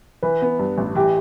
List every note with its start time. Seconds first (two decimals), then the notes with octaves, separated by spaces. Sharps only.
0.23 E3 B4
0.42 B3
0.59 G2
0.78 A1
0.95 E3 G4